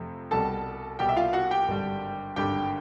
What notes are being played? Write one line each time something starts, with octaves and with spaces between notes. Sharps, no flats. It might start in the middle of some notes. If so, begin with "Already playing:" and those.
Already playing: F2 C3 F3 A3
C2 B2 G3 A4 A5
C2 B2 G3 G4 G5
E5
F4 F5
F#4 F#5
G4 G5
G#1 G2 D3 G3
G#1 G2 D3 G3 G4 G5